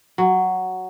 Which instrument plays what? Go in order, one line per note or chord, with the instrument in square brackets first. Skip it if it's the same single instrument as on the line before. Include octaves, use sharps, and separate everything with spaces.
[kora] F#3